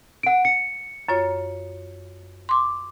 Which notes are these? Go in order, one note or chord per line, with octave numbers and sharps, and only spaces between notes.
F#5 D7
C#7
F#2 F4 C#5
C6 D6